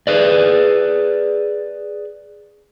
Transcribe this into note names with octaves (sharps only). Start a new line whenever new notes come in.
G#4 B4 D5